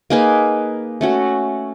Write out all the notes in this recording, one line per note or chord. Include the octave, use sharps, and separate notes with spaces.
A#3 D#4 G#4 B4
A3 C#4 F#4